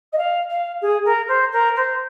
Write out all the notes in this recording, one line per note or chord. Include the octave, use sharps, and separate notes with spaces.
D#5
F5
F5
G#4
A#4
C5
A#4
C5